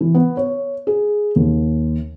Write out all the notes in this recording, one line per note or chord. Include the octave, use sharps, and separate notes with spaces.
E3
B3
C#5
G#4
D#2